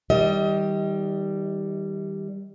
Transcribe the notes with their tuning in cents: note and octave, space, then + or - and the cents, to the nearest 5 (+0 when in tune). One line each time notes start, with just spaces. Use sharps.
D#3 +40 G3 +0 D#5 +30